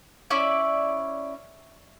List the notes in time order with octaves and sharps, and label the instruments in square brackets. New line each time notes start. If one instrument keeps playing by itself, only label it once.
[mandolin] C#4 E4 D5